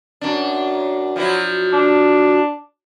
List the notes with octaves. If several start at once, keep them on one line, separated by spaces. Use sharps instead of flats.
F#2 D4
F3 F#3 E4
D4